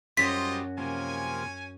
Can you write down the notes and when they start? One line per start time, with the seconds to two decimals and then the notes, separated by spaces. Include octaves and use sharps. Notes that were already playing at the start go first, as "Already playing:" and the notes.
0.17 F#2 F#3 G3 F4 F#4 C5 D#5 B6
0.77 C3 F3 A#3 C#4 G#5